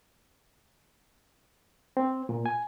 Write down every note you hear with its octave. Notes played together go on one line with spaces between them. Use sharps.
C4
A#2
G#5